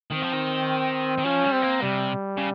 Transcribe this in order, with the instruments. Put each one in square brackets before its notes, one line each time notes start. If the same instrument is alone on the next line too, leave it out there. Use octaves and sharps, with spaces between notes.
[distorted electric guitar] D#3 [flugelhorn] C4
[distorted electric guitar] F3
D#3
D#3
[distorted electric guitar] F3 [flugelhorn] C#4
[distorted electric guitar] G3
[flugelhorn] C4
[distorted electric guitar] A#3
[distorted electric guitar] C3 [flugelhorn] G3
[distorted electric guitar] C#3